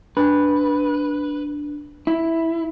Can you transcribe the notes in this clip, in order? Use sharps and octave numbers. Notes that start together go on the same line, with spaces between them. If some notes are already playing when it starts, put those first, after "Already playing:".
D4 B4
E4